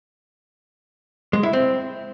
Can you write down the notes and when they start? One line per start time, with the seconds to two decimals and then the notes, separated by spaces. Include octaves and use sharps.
1.33 G#3
1.43 E4
1.53 C4